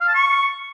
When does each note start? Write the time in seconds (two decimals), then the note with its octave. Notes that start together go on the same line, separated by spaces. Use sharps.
0.01 F5
0.08 A5
0.15 C#6